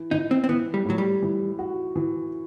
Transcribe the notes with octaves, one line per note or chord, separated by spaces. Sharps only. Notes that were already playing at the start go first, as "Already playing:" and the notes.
Already playing: E3
E3 D#4
C4
C4
E3 B3
G3
A2 F#3
G3
E3
F#4
E3